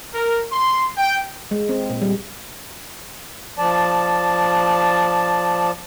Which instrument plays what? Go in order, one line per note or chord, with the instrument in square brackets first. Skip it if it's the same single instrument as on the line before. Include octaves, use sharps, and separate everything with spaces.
[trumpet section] A#4
C6
G5
[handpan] G#3
C4
A#2
G3
[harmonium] F3 D5 A5